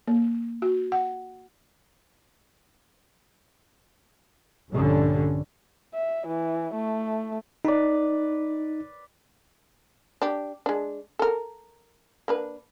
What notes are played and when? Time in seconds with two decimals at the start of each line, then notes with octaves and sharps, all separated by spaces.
0.07 A#3
0.62 F#4
0.92 F#5
4.71 A#1 G2 D3 G3 C#4
5.94 E5
6.27 E3
6.74 A3
7.65 D#4 B4 D5
10.22 D4 G4
10.66 G#3 D4
11.19 A4 A#4
12.28 A#3 D4 B4